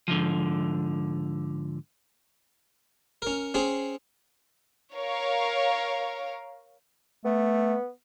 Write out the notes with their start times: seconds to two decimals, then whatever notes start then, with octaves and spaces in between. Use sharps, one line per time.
0.08 G#2 D3 E3 F3
3.22 C#4 A#4
3.54 C4 C#4 G#4
4.95 A#4 C#5 F5
7.25 A3 B3